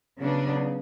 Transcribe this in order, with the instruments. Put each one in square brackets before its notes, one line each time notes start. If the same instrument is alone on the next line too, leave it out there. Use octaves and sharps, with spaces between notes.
[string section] C#3 F#3 B3 D4